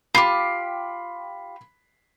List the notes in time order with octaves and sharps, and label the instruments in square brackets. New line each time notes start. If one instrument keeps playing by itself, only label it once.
[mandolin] F4 G4 [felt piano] B5 C7